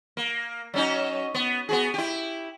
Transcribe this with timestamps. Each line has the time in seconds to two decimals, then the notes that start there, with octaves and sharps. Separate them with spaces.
0.17 A#3
0.74 F#3 C#4 D#4
1.34 B3
1.69 B3 F#4 G#4
1.94 E4 G4